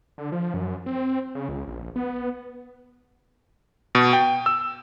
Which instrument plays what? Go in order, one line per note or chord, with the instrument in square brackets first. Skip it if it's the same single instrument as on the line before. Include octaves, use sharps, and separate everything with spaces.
[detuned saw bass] D3
F3
F#2
C4
C#3
C#2
A#1
B3
[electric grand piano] B2
G5
E6